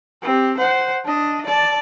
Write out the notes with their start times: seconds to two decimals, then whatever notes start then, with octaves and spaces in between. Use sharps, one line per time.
0.22 C4 G4
0.58 C5 F#5
1.05 D4 D#5
1.46 D5 A5